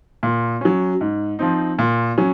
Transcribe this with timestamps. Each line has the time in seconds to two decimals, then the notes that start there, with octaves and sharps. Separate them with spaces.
0.23 A#2
0.61 F#3 C#4
1.01 G#2
1.39 F3 C4 D#4
1.79 A#2
2.18 F#3 C#4